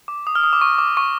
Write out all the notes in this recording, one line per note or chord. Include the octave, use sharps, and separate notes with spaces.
D6
D#6
F6
D#6
D6
C#6
D6
C#6